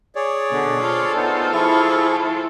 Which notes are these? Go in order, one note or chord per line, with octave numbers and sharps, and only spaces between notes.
G#4 C#5 D5
B2 D3
F4 A4 C5
B3 D#4
F3 E4 G#4 C#6